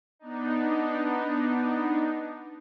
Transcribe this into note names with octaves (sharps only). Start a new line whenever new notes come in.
B3 D4 D#4